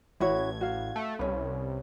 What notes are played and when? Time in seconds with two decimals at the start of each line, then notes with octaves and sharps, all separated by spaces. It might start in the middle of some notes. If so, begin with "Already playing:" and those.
0.20 A1 E4 F#4 C#5 G#6
0.61 F#4 F5
0.96 A3
1.19 C2 C#4 B4